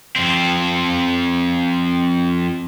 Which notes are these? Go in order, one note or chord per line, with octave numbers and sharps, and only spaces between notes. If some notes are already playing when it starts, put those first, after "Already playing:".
F2 C4